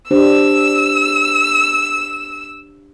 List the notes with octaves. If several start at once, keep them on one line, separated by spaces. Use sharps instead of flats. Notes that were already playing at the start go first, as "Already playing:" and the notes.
D4 G4 C5 E6